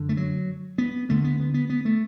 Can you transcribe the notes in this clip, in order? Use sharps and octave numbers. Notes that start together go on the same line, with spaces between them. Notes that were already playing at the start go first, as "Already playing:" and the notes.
Already playing: F#2 D3
A3
F#3
B3
D2 D3 A3
B3
B3
B3
B3
A3